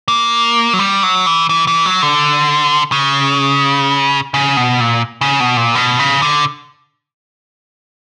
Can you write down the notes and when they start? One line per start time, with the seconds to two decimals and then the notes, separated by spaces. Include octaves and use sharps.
0.08 A#3
0.73 F#3
0.79 G3
1.03 F#3
1.26 E3
1.49 E3
1.67 E3
1.85 F#3
2.02 D3
2.92 C#3
4.34 C#3
4.57 B2
4.80 A#2
5.21 C#3
5.40 B2
5.57 A#2
5.75 B2
5.99 C#3
6.22 D3